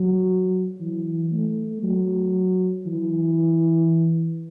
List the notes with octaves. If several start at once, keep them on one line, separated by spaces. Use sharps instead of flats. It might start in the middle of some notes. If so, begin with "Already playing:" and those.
Already playing: F#3
E3
A3
F#3
E3